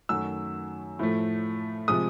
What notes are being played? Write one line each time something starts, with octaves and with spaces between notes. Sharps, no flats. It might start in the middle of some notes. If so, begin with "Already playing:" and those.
F#2 D#3 F#3 A3 E6
A2 F3 A3
C3 F3 G#3 D#6